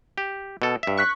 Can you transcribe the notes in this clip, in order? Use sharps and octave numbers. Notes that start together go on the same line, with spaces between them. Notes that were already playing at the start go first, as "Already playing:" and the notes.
G4
B2 A4
G2 E5
C#6 F#6 B6